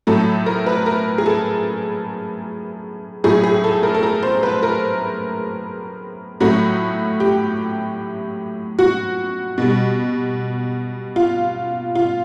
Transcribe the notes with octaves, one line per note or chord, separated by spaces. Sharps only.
A2 F#3 A3 A4
A#4
B4
A#4
G#4
A4
A2 F#3 A3 G#4
G#4
A4
A#4
A4
A#4
C5
B4
A#4
A2 F#3 A3 F#4
G4
F#4
B2 G3
F4
F4